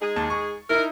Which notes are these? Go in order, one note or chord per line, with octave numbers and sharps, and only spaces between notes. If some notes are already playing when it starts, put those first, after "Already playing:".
G#3 D#4 G#4
D#2 A5
C#6
D#4 E4 A#4